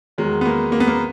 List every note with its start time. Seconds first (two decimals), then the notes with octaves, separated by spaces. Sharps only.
0.18 E2 D#3 F#3 G#3
0.41 B3
0.45 A#3
0.72 A#3
0.80 B3
0.88 A#3